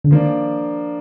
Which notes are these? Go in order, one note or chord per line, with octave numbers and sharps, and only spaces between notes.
D3
D#3 F3 A#3 D4